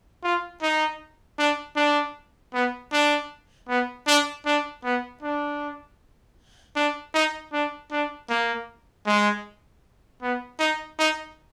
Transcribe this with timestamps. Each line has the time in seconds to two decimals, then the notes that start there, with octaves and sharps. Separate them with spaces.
0.24 F4
0.62 D#4
1.39 D4
1.77 D4
2.54 B3
2.93 D4
3.69 B3
4.07 D4
4.46 D4
4.84 B3
5.23 D4
6.76 D4
7.15 D#4
7.53 D4
7.92 D4
8.30 A#3
9.06 G#3
10.22 B3
10.60 D#4
10.99 D#4